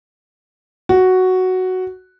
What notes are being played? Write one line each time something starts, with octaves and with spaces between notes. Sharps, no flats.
F#4